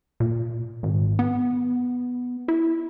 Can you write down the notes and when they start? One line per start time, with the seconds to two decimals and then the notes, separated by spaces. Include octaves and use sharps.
0.20 A#2
0.83 G#1
1.19 B3
2.48 E4